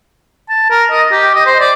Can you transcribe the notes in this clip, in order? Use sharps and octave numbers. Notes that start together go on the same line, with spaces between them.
A5
A#4
D#5
G4
D#5
C5
D5